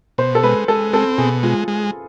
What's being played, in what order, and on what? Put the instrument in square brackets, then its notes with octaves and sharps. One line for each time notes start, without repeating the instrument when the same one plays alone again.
[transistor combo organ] B2 [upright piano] C5
[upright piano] A4
[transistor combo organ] G#3 [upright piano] B4
[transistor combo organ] G#3 [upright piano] A4
[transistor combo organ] C4 [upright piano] A4
[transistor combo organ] B2 [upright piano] G#4
[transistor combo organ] G#3 [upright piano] F4
[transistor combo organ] G#3